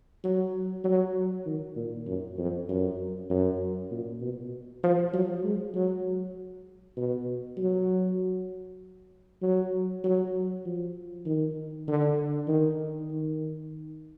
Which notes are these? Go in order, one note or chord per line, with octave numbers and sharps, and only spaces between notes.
F#3
F#3
D#3
A#2
F#2
F2
F#2
F#2
A#2
B2
F3
F#3
G#3
F#3
B2
F#3
F#3
F#3
F3
D#3
D3
D#3
D#3